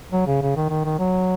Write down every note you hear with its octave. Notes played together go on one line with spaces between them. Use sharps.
F#3
C#3
C#3
D#3
D#3
D#3
F#3